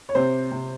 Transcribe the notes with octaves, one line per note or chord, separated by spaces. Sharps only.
C#5
C3 C5
C3